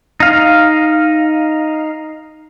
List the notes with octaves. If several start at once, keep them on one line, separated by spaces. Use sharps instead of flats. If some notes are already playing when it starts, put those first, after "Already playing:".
D#4 F5